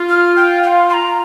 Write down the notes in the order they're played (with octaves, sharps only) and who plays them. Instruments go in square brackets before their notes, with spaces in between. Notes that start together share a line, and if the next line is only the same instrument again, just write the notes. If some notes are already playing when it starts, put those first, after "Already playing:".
Already playing: [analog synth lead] F4
[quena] F6
G5
G5
F5
C6
A#5